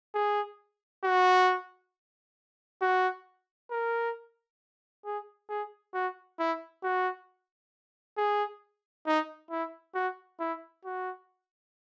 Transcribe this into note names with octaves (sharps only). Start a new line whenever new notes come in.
G#4
F#4
F#4
A#4
G#4
G#4
F#4
E4
F#4
G#4
D#4
E4
F#4
E4
F#4